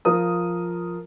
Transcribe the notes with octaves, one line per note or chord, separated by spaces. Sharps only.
F3 F4 A#4 D#6